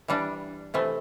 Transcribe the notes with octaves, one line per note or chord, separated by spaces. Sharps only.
E3 G3 D4
C3 E3 A3 C4